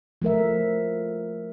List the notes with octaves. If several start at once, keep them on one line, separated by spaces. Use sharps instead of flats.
F3 A3 A#4 E5